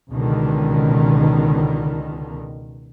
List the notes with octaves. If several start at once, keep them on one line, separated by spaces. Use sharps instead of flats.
C#2 B2 D3 D#3